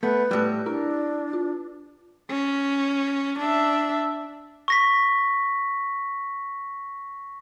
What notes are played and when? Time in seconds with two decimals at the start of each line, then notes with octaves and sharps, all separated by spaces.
0.03 A3 B3 B4 G6
0.31 A2 G3 G4 E6 A#6
0.66 D4 E4 A#4
1.33 F4
2.30 C#4
3.39 D4 E5
4.68 C#6 A#6 B6